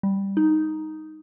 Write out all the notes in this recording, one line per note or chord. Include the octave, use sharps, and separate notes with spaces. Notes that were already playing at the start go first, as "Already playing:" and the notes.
G3
D#4